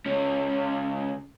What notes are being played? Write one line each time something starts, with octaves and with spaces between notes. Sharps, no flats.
C#2 C#4